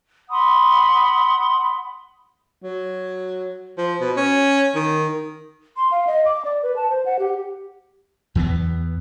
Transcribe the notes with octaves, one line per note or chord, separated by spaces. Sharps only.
F#5 B5 C6 D#6
F#3
F3
B2
C#4
D#3
C6
F5
D#5
D6
D5
B4
A5
C5
F#5
G4
E2 E3 F3 B3